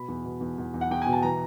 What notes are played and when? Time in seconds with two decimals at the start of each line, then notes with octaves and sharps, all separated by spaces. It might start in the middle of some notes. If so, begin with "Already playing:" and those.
Already playing: B2 B5
0.08 E2
0.24 B2
0.41 E2
0.58 E2
0.74 E2
0.81 F#5
0.91 E2 G5
1.02 B2 G#5
1.13 A5
1.22 E3 A#5